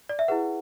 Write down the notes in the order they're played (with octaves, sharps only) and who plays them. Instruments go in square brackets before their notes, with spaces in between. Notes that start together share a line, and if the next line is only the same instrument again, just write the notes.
[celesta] D5
E5
E4 G#4 B4 F#5